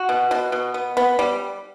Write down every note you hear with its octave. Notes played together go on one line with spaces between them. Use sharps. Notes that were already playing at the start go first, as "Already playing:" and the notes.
Already playing: F#4
B2
B2
B2
B3
B3
G3